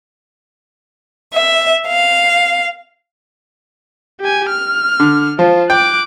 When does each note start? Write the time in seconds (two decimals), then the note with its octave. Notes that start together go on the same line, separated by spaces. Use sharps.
1.32 E5
1.87 F5
4.21 G4 G#5
4.49 F6
5.00 D3
5.39 F3 F4
5.70 G5 D6 F#6